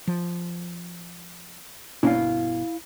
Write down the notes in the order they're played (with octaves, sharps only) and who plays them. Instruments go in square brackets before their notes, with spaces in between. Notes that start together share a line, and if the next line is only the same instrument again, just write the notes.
[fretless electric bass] F3
[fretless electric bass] G1 B2 [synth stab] A#3 C#4 D4 [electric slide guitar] E4 F5